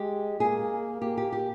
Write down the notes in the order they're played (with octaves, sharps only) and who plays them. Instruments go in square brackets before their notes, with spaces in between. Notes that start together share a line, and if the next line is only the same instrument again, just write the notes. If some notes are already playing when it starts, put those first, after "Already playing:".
Already playing: [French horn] G#3 [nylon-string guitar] G4
[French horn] A#3 [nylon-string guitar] G#4
[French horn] A#3 [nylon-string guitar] G4
[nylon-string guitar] G4
G4